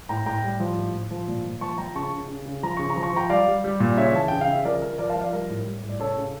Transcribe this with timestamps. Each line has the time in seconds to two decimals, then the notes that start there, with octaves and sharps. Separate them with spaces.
0.09 A2 G5 A#5
0.26 A2 G5 A#5
0.44 G3
0.60 F3
0.77 A2
0.94 A2
1.11 F3
1.28 A#2
1.45 A#2
1.61 F3 A5 C#6
1.78 F3 G5 A#5
1.95 C#3 A5 C#6
2.13 C#3
2.28 C#3
2.46 C#3
2.63 F3 A#5
2.77 C#3 C#6
2.90 A#5
2.97 F3
3.03 C#6
3.13 F3 G5 A#5
3.30 G3 D5 F5
3.48 G3
3.64 G3
3.80 A#2
3.97 C#3 C#5 E5
4.14 E3 A5
4.28 C#3 G5
4.41 F5
4.48 C#3 E5
4.65 F3 A#4 D5
4.82 F3 A#4
4.98 F3 A#4 D5
5.10 F5 A5
5.15 F3
5.21 D5 F5
5.32 G3 A#4
5.50 A2
5.66 G3
5.84 A2
5.89 D5
6.00 C#3 A4 C#5
6.17 C#3